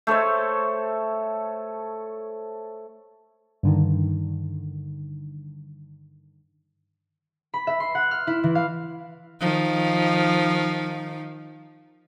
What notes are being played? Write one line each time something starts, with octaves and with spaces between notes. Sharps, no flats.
A3 A4 C5 C#5
G2 D3 D#3
B5
E5
C6
F#5
F6
E4
E3
F5
D#3 F3